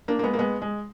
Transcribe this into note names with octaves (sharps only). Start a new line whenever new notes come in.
A#3 D4
A#3
G#3 B3
A#3
G#3 B3
G#3